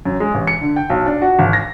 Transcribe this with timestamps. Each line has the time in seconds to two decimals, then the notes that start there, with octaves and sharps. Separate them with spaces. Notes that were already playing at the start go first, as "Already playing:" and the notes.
0.05 F#2
0.20 G#3
0.34 A1
0.47 C#7
0.61 D3
0.76 G5
0.90 B1
1.06 D4
1.22 F#4
1.39 G#1
1.53 A#6